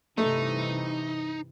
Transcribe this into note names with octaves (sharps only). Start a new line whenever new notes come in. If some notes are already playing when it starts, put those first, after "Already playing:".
G2 C3 E3 A3 D#4